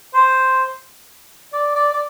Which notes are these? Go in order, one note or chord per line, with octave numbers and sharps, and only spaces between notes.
C5
D5
D5
D5